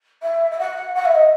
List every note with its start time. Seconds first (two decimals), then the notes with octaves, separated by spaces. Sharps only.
0.22 E5
0.51 E5
0.58 F#5
0.94 F#5
1.05 E5
1.14 D#5